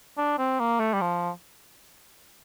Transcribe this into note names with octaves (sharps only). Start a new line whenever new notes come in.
D4
C4
A#3
A3
G3
F3